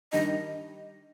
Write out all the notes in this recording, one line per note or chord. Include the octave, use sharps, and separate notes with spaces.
D#3 G3 D4 D#5